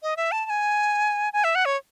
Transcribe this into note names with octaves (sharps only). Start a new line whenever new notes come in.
D#5
E5
A5
A5
G#5
G#5
E5
F#5
C#5